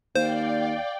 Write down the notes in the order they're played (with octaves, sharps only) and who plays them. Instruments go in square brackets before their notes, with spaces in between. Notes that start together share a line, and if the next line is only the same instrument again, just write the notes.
[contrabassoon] D#2 [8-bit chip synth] C5 [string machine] D5 G5 [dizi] F5